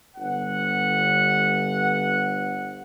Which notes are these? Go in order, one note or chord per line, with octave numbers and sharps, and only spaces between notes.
G1 F#5